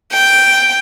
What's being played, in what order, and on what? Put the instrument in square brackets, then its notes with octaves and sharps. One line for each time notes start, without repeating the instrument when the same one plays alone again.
[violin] G5